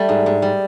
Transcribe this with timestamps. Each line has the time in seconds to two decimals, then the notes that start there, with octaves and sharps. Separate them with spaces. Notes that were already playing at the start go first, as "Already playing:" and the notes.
Already playing: G3 A3
0.09 G#2
0.26 G#2
0.42 G3